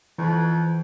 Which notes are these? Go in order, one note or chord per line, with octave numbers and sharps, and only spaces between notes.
F2 E3